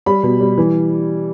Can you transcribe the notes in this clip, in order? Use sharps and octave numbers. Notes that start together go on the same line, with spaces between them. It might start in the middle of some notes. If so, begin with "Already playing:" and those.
G3 B5
B2
G3
E3